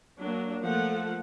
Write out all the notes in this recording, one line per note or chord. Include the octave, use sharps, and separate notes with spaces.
F#3 A#3 D4
F3 A3 A#3 F4 A4 F#5